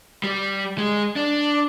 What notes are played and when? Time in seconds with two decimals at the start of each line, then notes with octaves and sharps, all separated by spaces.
0.24 G3
0.78 G#3
1.16 D4